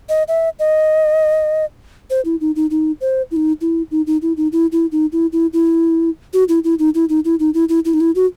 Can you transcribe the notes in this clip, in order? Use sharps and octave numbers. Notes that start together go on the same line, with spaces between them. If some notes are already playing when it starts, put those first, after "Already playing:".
D#5
E5
D#5
C5
E4
D#4
D#4
D#4
C5
E4
D#4
E4
D#4
D#4
E4
D#4
E4
E4
D#4
E4
E4
E4
F#4
E4
E4
D#4
E4
D#4
E4
D#4
E4
E4
E4
D#4
E4
F#4